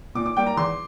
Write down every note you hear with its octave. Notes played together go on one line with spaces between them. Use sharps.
A#2 D6
D6
G3 A#3 G5
A#5
E2 C6